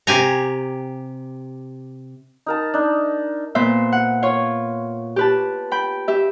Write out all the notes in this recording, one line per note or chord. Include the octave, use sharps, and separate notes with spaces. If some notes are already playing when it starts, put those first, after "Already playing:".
C3 G4 G#5 A#5
D#4 A#4 A5
D4 D#4
A#2 B3 C5 E5
F#5
F4 C#5
G4 B4 A5
G5 B5
G4 E5